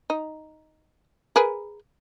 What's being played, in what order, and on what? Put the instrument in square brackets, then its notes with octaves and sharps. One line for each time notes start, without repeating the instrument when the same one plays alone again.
[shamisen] D#4
G#4 A#4 B4